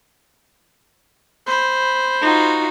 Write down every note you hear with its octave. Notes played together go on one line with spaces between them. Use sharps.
C5 B5
D#4 F4 F#4